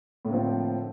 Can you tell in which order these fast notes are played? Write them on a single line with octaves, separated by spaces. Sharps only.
A2 A#3 D3 F3 C4